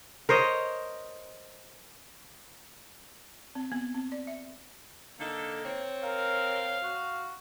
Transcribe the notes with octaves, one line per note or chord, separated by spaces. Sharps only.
A#4 C5 C#5 D#5
C4
B3
C4
D5
E5
D3 A#3 D#4 A4
C4 C5 C#5
A#4 F5
F#4